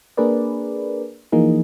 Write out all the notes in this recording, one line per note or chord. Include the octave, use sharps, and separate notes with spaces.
A#3 D4 G#4 A#4 B4 D5
E3 F3 A#3 D#4 G#4